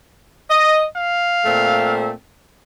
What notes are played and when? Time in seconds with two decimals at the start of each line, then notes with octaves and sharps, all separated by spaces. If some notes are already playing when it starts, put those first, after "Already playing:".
0.50 D#5
0.97 F5
1.45 A#2 A3 C4